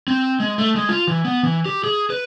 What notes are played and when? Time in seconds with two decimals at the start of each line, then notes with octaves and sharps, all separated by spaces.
0.08 C4
0.40 G#3
0.58 A3
0.76 G#3
0.89 F4
1.08 E3
1.25 B3
1.43 E3
1.65 G4
1.84 G#4
2.10 B4